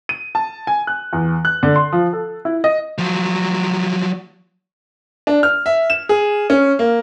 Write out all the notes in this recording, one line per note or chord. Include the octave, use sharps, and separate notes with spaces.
D#7
A5
G#5
F#6
E2
F#6
D3
C6
F3
A4
E4
D#5
F3 F#3
D4
F6
E5
E7
G#4
C#4
A#3